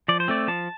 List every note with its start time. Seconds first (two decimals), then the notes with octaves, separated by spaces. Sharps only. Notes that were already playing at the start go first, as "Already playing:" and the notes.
0.08 F3 D5
0.20 C5
0.28 A3 C4 D5
0.48 F3 A5